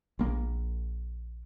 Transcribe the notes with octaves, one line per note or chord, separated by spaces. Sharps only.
A#1 A#3